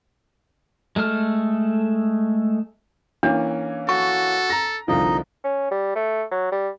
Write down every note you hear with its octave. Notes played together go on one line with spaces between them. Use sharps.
G#3 A3 A4 F6
E3 A#3 C#4 D4
F#4 A4 C#6
A#5 A#6
C2 D3 F3 D#4 D#5
C#4
G3
A3
F#3
G3